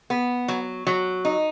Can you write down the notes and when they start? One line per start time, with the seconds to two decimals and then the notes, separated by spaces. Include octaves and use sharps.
0.10 B3
0.48 F#3
0.87 F#3
1.25 D#4